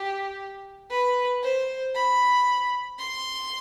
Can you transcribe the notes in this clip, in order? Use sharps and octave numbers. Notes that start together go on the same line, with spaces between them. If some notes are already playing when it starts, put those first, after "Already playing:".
Already playing: G4
B4
C5
B5
C6